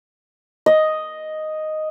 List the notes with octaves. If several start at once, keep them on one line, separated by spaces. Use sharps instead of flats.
D#5